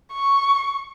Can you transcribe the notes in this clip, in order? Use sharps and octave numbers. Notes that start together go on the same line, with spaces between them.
C#6